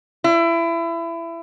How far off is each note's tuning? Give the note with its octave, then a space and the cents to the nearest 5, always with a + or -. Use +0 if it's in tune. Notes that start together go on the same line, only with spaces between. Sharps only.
E4 +25